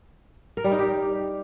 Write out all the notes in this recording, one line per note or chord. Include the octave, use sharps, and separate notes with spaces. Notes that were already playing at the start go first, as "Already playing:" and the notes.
A#4
G3
D#4
G4